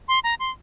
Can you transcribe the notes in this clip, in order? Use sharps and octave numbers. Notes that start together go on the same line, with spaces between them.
C6
A#5
C6